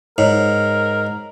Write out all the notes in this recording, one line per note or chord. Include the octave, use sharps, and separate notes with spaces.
G#2 A#4 C#5